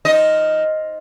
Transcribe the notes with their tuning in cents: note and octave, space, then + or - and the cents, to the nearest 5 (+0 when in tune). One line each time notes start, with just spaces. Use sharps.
F3 +0 D#4 +5 D#5 +0